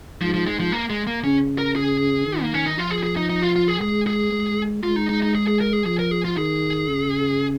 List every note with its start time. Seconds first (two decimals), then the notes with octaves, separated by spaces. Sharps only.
0.21 G#2 F3
0.34 F3
0.47 G#3
0.60 F3
0.72 A#3
0.90 G#3
1.07 A#3
1.24 C#3 C#4
1.58 A#4
1.76 G#4
2.27 D#3
2.41 A#3
2.54 C#4
2.66 D#4
2.78 F3 F4
2.91 G#4
3.04 G#4
3.16 D#4
3.30 D#4
3.42 F4
3.56 F4
3.68 G#4
3.81 G#3 G#4
4.07 G#4
4.32 G#3
4.83 G#3 F4
4.96 D#4
5.09 D#4
5.22 D#4
5.35 G#4
5.47 G#4
5.61 A#4
5.73 G#4
5.86 F3 G#4
5.99 A#4
6.11 G#4
6.25 F4
6.37 D#3 G#4
6.89 C#3